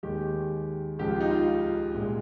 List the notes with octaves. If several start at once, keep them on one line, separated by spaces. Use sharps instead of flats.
D#2 D#3 G#3 G4
C#2 C#3 F3 G#3 G4
F4
D#4
F4
C2 A#2 G#3